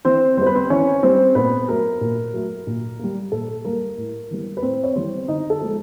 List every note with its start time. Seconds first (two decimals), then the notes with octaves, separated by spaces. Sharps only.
0.05 E3 C4 C5
0.37 G3 C5
0.42 B3 B4
0.55 C4 C5
0.70 E3 C#4 C#5
1.03 G3 B3 C4 C5
1.35 A#2 B3 B4
1.68 F#3 A3 A#4
2.01 A#2
2.34 F#3 A3
2.67 A#2
2.99 G3 A#3
3.32 A#2 A4
3.64 G3 A#3 A#4
3.97 A2
4.30 E3 G3 B3
4.57 B4
4.62 A2 C4 C5
4.84 C#5
4.95 E3 G3 B3 C4 C5
5.28 D3 D#4 D#5
5.50 A4
5.61 F3 G#3 B3